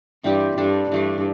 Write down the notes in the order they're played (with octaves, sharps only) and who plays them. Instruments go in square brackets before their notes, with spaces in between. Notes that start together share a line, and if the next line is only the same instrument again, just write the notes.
[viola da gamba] G2 [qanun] E3 G3 C4 G4
[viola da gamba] G2 [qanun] G3 D4 A4
[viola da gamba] G2 [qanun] E3 A3 D4